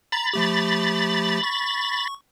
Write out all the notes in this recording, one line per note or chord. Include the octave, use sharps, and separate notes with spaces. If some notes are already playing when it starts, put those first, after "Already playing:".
A#5 B5 A6
F3 A3 G4
C#6